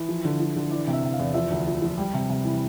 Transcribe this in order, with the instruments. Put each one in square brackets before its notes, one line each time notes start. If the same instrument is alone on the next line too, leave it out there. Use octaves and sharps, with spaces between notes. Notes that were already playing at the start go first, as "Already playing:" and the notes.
Already playing: [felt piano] E3
F3
D3
F3
D3
E3 D5
C3
E5
C3
F5
E2
F3 E5
D2
F3
F3
G3
C3
C3
E3